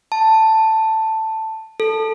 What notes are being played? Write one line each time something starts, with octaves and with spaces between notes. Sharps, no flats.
A5
A4